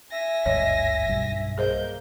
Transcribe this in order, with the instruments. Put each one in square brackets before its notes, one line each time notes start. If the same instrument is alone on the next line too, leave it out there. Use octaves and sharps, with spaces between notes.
[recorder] E5 [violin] G#5 A#6
[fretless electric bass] G#1 D2 G2 [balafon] C#5 D#5
[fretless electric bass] B1 G2
[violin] A#3 G6 [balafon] G#4 C5 D#5